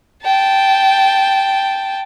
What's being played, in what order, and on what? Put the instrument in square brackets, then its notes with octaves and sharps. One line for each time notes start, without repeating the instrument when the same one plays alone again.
[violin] G5 A5